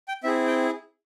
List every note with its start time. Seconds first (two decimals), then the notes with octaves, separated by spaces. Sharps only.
0.08 G5
0.24 C4 E4 G#4 E5
0.47 G5